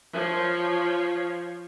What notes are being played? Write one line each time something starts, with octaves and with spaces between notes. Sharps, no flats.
F3 C#5